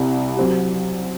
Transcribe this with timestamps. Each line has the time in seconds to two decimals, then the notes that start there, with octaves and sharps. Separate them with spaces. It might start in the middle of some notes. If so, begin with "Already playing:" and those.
Already playing: C2 C3 E4
0.36 F#3 C4 G4